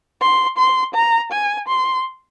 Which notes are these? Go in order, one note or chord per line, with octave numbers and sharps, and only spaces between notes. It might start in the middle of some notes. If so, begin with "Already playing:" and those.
C6
C6
A#5
G#5
C6